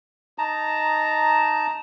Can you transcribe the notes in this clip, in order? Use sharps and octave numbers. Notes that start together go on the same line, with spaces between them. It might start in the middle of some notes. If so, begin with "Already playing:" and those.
D#4 A5 A#5